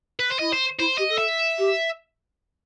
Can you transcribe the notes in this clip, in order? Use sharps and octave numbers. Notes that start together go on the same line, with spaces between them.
B4
C5
E4 D#5
C5
E4 C5
G4 D#5
A4
E5
G4